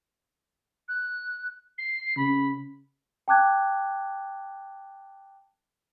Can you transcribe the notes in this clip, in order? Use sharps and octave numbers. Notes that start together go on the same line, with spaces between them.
F#6
C7
C#3 B5
G5 A5 D6 F#6 G#6